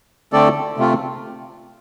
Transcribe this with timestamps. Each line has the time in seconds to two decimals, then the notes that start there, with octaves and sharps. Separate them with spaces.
0.33 D3 A3 C4 A4 D5
0.77 C3 A3 C4 F4